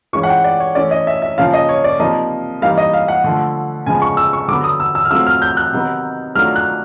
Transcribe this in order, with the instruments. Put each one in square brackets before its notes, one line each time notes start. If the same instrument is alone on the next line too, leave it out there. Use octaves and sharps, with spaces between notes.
[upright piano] E3 G#3 C#4 F4 C#6
F#5
G5
D5
C#5
E3 A3 C#4 D5
D#5
E5
E5
C#3 F3 A#3 C#4 F4 F5
D#5
C#5
D5
C3 F3 A#3 D#4 D#5
E3 G3 A#3 D#4 F5
D#5
F5
F#5
D3 F3 A3
C#3 F3 G#3 B3 G#5
C#6
E6
C#6
D3 F#3 B3 D6
D#6
E6
E6
F6
F#3 A3 C4 F4 E6
F6
G6
F#6
C3 D#3 F#3 B3 D#4
D#3 F#3 A3 D4 F4 F6
F#6